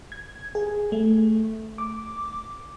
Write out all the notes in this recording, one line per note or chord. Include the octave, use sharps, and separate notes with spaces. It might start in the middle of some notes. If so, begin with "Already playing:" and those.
G#6
G#4
A3
D6